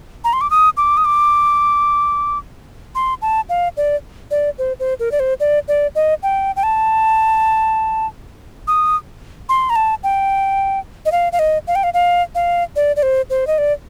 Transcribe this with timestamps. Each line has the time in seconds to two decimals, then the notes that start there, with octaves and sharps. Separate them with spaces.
0.24 A#5
0.33 C6
0.41 D6
0.51 D#6
0.77 D6
0.97 D#6
1.05 D6
2.95 C6
3.22 A5
3.49 F5
3.77 D5
4.31 D5
4.58 C5
4.80 C5
4.99 A#4
5.12 D5
5.20 C5
5.40 D5
5.68 D5
5.95 D#5
6.23 G5
6.56 G5
6.63 A5
8.68 D#6
9.49 C6
9.70 A#5
9.76 A5
10.03 G5
11.06 D#5
11.12 F5
11.33 F5
11.39 D#5
11.67 F5
11.75 G5
11.84 F5
11.94 F5
12.35 F5
12.76 D5
12.96 D5
13.03 C5
13.30 C5
13.47 D#5
13.58 D5